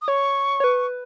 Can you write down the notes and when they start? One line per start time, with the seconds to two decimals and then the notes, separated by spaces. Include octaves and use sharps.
0.02 D#6
0.08 C#5 C#6
0.60 C#5
0.64 B4